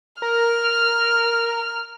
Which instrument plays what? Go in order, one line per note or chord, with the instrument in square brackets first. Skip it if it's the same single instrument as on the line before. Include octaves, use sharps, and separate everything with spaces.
[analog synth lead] A#4 [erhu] F6